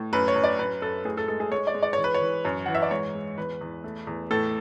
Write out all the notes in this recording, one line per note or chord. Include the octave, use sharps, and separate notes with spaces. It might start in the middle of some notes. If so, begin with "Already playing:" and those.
Already playing: A2
F#2 B4
C#5
F#2
D5
F#2 B4
F#2 A4
A2 G#4
A4
G#3 A4
G#4
G#3 C#5
D5
G#3
D5
E3 C#5
B4
C#5
E3
F#2
E3 F#5
E5
D5
G#2 C#5
G#3
E2 B4
E2
A3
E2
A2 A4